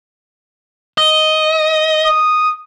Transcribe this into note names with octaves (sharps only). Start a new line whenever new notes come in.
D#5
D#6